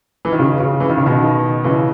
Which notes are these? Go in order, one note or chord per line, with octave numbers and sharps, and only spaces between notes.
E3
D#3
C#3
C#3
E3
D#3
C#3
B2 D#3
C#3 E3